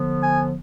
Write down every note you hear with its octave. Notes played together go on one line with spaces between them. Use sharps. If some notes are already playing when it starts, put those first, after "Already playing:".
Already playing: D3 F3 B3
G#5